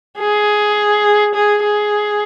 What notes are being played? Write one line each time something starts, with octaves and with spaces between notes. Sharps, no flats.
G#4
G#4
G#4